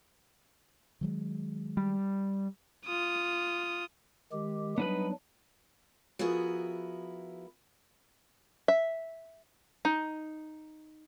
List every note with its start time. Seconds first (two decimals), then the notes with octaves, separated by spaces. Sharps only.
1.01 D#3 F#3 G#3
1.77 G3
2.86 F4 D#6
4.32 D#3 G#3 G4
4.78 F#3 G3 B3 D4 D#4 B4
6.19 F3 B3 E4 F#4 G#4 A#4
8.68 E5
9.85 D#4